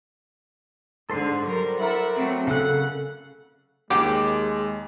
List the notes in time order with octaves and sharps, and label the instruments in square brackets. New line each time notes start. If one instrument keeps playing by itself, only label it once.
[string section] G#2 D3 [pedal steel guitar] A4 C5 C6
[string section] F#3 G3 A#4
[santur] E4 A#4 D5 [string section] E5 F#5
[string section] F#3 A3 [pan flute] C4
[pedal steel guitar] C#3 F#6 [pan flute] A4 [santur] F5 [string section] F#5
[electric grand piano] D#2 D6 [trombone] G#3 [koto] G4